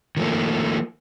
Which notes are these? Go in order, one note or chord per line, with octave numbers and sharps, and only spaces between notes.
D#3 F3 A3 A#3